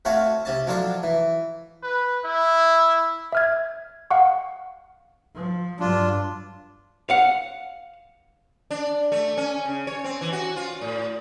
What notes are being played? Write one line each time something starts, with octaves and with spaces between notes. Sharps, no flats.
A3 C4 F#4 C#5 F5
C3 C#4 A5
F3 F#3 D4 F4 A4
E3
B4
E4
E5 F6 G#6
F5 F#5 C#6
F3
G2 F#3 D4 F4
F5 F#5
D4
A3
C#4
C#3
C#5
C4
E3
F#4
F4
A2